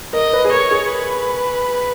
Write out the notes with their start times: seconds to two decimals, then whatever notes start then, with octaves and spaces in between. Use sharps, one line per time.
0.13 A#4 D#5
0.33 B4
0.45 G#4
0.52 A#4 C#5
0.71 G#4
0.91 B4